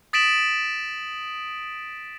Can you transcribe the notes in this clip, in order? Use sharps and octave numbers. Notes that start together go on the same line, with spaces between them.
D#6 A6 B6 D7 E7 F#7